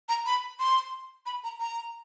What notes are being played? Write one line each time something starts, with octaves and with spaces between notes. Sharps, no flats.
A#5
B5
C6
B5
A#5
A#5